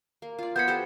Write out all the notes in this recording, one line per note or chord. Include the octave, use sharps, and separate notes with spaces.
A#3
F4 D5
B3 C5 B5 G6 G#6 C#7
G4 A4 C5